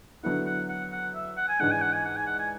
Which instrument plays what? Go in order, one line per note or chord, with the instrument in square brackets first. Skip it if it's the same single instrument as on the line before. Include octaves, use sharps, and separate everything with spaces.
[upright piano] D3 F#3 B3 E4 [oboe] F#5
[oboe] F#5
F#5
F#5
E5
F#5
G#5
[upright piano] G#2 E3 G#3 D4 [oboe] F#5
[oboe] G#5
F#5
G#5
F#5
G#5
F#5
G#5